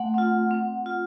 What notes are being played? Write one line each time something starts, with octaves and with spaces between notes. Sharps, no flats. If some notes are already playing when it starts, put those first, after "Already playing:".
Already playing: A3 F#5
C4 F4
C4
F4